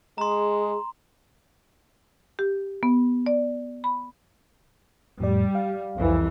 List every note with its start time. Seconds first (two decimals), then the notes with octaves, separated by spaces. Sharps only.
0.18 G#3 G#4 A#5 C6
2.39 G4
2.83 B3
3.26 D5
3.84 B5
5.20 F2 A2 G3 D5
5.55 F5
5.98 C2 F2 E3